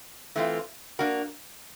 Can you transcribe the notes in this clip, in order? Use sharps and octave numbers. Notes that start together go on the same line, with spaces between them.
E3 A3 C4 F4
A#3 D4 F#4 A#4